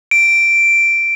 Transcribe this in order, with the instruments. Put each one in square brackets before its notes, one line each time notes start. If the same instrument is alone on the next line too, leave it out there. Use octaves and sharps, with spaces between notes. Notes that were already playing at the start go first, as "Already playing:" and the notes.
[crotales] D7